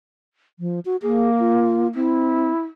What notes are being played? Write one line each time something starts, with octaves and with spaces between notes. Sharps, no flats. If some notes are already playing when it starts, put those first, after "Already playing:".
F3
F#4
A#3 G#4
F4
C4 E4